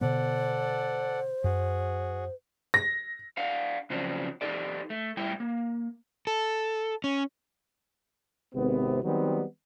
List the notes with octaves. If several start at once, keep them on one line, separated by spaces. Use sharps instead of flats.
B2 D3 B3 A4 C5 D5 F#5
F#2 F#4 G#4
A#6
D4 F5 F#5
C#3 F3 F#3 C4 D4
D#4 G4 A4 D5
A3
A2 G3 E4 E5 G5
A#3
A4
C#4
G#1 C3 B3
D#3 F#3 G3 B3 C4 D#4